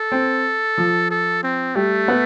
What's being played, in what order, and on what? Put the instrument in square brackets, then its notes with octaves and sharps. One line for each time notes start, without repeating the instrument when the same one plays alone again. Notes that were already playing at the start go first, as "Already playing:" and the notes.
Already playing: [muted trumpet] A4
[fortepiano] C4
F3
[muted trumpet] A4
C4
[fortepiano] G3 [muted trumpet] A3
[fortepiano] B3